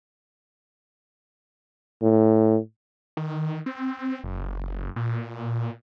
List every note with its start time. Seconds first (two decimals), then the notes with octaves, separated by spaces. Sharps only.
2.02 A2
3.17 D#3
3.66 C4
4.24 F#1
4.96 A#2